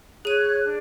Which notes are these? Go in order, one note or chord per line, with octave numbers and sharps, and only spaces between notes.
G#4 C#5 F#6 D#7
D4